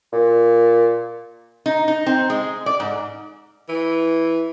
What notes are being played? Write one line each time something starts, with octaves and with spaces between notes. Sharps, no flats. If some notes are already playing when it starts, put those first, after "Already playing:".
A#2
D#4
D#4
C4
G#3
D5
G#2
E3